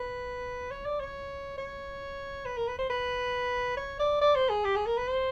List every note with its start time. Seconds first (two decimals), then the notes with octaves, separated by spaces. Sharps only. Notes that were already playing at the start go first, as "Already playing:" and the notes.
Already playing: B4
0.71 C#5
0.85 D5
1.00 C#5
1.58 C#5
2.46 B4
2.57 A#4
2.68 B4
2.79 C5
2.90 B4
3.77 C#5
4.00 D5
4.21 D5
4.35 C5
4.50 G#4
4.65 G4
4.76 G#4
4.86 A#4
4.98 B4
5.08 C5